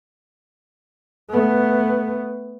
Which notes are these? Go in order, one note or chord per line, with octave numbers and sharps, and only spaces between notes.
A3 B3